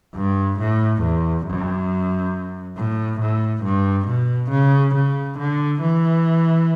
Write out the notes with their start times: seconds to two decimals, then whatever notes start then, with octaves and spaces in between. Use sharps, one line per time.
0.15 G2
0.59 A2
1.02 E2
1.46 F#2
2.76 A2
3.20 A2
3.64 G2
4.07 B2
4.51 C#3
4.94 C#3
5.38 D3
5.82 E3